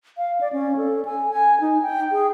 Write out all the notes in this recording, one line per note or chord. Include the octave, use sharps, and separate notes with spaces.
F5
D5
C#4
A4
G#5
G#5
D#4
G5
G#4